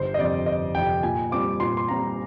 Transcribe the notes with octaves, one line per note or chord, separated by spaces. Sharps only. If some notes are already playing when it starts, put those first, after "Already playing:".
Already playing: G1 C5
D#5
F2 C3 D5
G1 D#5
F2 C3 G5
A#2 G#5
G3 C4 F4 D6
A#2 C6
C6
G3 C4 F4 A#5